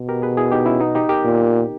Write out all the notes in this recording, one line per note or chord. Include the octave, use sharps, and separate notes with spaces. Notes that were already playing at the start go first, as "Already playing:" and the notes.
Already playing: B2
G4 A#4
G#4 B4
E4 G#4
D#4 G4
C#4 E4
B3 D#4
D#4 G4
G4 A#4
A#2